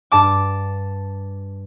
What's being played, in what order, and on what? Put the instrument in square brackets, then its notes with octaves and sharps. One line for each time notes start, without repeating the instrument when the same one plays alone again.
[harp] G2 A5 D6